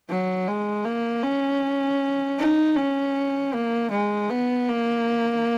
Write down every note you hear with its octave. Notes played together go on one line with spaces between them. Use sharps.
F#3
G#3
A#3
C#4
D#4
C#4
A#3
G#3
B3
A#3